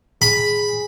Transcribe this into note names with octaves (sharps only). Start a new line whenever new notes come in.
G#4 B5